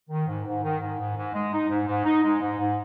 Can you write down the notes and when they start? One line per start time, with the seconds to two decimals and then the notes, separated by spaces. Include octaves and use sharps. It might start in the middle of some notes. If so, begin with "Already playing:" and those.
0.10 D#3
0.27 G#2
0.45 G#2
0.63 D#3
0.80 G#2
0.98 G#2
1.16 G#2
1.34 G#3
1.52 D#4
1.70 G#2
1.87 G#2
2.05 D#4
2.22 G#3
2.41 G#2
2.58 G#2